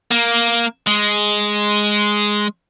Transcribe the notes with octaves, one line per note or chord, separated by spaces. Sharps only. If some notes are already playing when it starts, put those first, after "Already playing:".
A#3
G#3